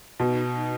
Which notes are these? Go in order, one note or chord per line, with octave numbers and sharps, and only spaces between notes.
B2 D#4